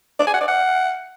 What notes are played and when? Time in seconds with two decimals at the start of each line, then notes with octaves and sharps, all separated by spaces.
0.20 D5
0.27 G#5
0.34 F#5
0.41 D5
0.48 F#5